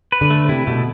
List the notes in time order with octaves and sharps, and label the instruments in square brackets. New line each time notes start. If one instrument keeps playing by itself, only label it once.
[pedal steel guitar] B4
[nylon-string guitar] D3
[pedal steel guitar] A3
[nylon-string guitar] C3 [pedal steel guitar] E4
[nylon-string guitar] B2 [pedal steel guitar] A3